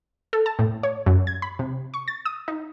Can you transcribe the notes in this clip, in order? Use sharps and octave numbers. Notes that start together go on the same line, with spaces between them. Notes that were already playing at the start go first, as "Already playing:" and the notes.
A4
A5
A2
C#5
F#2
G#6
B5
C3
C#6
A6
D#6
D#4